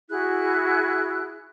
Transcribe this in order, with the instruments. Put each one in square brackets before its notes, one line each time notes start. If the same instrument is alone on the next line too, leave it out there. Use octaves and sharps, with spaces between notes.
[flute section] E4 F#4 G#4 F#6